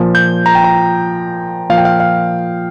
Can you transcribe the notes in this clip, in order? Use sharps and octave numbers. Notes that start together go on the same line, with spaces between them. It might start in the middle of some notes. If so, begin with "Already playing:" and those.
Already playing: A#2 F3
G6
A#5
G5
A#5
A#2 F3 F5
G5
F5
F5